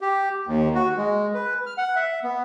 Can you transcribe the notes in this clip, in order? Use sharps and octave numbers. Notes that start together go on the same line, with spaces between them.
G4
D#2
F#4
G#3
B4
F6
F#5
E5
B3